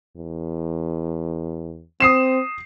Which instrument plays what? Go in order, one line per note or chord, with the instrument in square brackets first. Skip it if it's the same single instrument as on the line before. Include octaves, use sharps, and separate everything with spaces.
[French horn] E2
[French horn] C4 [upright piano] D#6 C7 E7